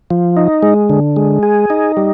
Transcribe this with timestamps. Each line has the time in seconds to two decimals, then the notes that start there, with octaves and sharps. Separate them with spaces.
0.11 F3
0.37 D#4
0.63 G#3
0.90 D3
1.16 G#3
1.43 G#4
1.70 D#4
1.97 G3